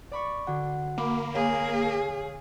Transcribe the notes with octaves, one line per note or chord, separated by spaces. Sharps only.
D5 B5 C#6
D3 F#4 F#5
A#3 B5 D6
G#4 C#5 F5 G#5